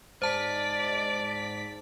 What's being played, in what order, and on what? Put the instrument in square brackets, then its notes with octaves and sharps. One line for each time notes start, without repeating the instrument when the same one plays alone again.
[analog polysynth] G#2 B6 [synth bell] C5 A5 [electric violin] D5